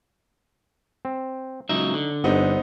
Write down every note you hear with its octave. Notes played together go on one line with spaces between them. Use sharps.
C4
C#2 F#3 D#4 E5
D3
G1 B3 C4 D#4